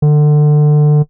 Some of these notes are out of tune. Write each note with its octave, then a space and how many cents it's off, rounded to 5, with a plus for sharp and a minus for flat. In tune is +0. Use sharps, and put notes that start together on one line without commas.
D3 +25